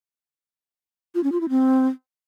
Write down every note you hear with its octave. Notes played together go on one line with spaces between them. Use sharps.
F4
C#4
F4
E4
C4